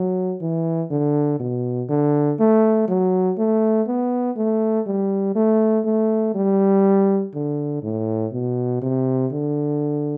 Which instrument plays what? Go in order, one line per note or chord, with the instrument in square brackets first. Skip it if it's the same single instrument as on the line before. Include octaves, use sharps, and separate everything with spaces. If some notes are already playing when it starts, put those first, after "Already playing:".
Already playing: [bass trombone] F#3
E3
D3
B2
D3
A3
F#3
A3
B3
A3
G3
A3
A3
G3
D3
A2
B2
C3
D3